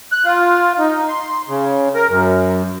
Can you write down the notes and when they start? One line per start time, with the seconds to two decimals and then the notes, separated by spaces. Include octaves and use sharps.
0.12 F#6
0.25 F4
0.79 D#4
1.08 C6
1.48 C#3
1.95 A#4
2.09 F#2